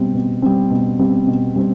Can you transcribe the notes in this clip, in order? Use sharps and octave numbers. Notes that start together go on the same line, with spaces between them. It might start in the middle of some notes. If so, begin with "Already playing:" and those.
Already playing: B2 G3 C4
B2
G3 C4
B2
G3 C4
B2
G3 C4